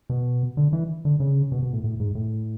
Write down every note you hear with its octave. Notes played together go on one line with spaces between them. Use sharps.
B2
D3
E3
D3
C#3
B2
B2
A2
A2
G#2
A2